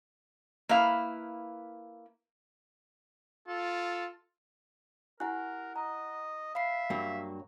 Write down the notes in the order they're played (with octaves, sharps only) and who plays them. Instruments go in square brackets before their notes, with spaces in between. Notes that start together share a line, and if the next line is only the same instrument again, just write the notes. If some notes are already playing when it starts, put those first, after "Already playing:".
[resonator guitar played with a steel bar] A#3 E4 B4 F5
[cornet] F4 [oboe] A4
[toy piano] E4 G4 G#5 [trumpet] A#4 [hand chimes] F#5 F#6
[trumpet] D#5 [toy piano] A#5
[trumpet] E5 [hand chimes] F5 B5 C7
[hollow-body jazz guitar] G2 F#3 A#3